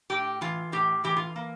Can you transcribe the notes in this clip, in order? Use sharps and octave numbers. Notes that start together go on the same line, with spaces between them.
A2 G4
E3 F4
A2 G4
E3 G4
F4
A#3